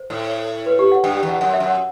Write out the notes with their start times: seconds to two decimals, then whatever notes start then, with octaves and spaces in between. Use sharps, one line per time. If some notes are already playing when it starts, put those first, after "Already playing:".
Already playing: C5
0.10 A2
0.66 B4
0.79 G4
0.92 F#5
1.04 G2 G5
1.17 G5
1.23 E2
1.29 F#5
1.41 F#2 F#5
1.54 E5
1.60 F#2
1.66 F#5